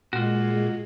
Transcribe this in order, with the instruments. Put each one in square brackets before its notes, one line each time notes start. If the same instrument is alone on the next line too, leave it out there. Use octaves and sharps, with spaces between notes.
[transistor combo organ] A#2 [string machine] G#3 [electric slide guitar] F4 F#4